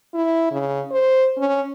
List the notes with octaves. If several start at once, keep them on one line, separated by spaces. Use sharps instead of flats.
E4
C#3
C5
C#4